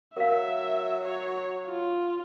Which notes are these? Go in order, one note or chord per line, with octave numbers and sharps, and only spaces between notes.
F#3 A#4 E5 F5
C#5
F4